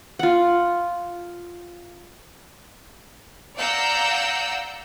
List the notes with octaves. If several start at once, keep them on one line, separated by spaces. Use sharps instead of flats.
F4 F#5
D5 F5 F#5 A#5 E6 G6